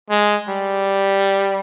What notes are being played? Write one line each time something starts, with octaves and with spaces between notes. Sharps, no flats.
G#3
G3